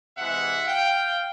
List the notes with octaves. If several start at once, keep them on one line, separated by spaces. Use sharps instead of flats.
C3 E3 G#3 E5 F#5
F5 G5